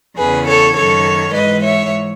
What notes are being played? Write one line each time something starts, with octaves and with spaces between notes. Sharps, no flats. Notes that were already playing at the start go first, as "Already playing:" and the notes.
E2 C#3 E3 G#4 B4
A4 C#5
F#2 D#3 A4 C#5
G#2 E3 B4 D#5
C#5 E5